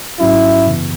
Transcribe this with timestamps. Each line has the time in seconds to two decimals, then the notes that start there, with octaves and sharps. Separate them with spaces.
0.19 G#2 F#3 C#4 E4 F#4
0.66 F#2 C#3 E3 B3